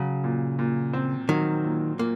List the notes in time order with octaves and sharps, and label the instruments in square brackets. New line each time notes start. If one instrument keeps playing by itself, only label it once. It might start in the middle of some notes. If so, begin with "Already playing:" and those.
Already playing: [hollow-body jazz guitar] C#3 [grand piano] F#3
[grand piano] A#2
A#2
C4
[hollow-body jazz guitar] D#3 [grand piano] F#3
[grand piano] A#2
[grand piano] A#2 [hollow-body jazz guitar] A#3